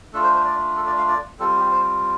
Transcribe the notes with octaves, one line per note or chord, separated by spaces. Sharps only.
A3 D4 F4 A4
C5
C5
D5
A4
D5
F5
D5
G3 C4 F4 A4
G4
C5